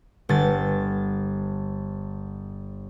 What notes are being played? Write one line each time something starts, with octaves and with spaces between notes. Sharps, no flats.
G1 A6